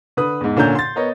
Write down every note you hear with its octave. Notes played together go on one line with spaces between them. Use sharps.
D3 B4 D#6
E2 G#2
A#2 D3 C#4 A#5 G6
C6 A6
B3 A#4 C#5 D#5